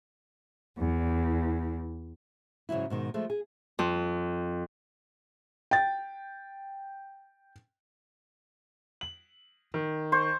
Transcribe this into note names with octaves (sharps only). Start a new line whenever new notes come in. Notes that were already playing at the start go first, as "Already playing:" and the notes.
E2
G#2 C#3 E3 F#3 E4
G#2 B2 D#3 G#3
F3 G#3 A3
G#4
F2
G5 A6
F#7
D#3
C5 C#6